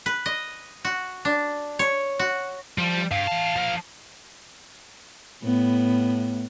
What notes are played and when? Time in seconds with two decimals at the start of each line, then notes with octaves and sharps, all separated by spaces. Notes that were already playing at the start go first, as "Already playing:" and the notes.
0.06 B4
0.26 D#5
0.85 F#4
1.25 D4
1.79 C#5
2.19 F#4
2.78 F3 G3
3.11 G2 F5
3.27 E3 A5
3.56 F3 A#4
5.44 A2 B3